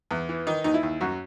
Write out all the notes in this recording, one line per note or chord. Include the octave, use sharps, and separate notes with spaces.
E2
E3
D#3 D#4
D#2 D#4
E4
D#2
F#2 F#4